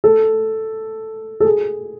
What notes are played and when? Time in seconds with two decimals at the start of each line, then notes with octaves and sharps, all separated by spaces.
0.04 A4
1.40 A4
1.45 G#4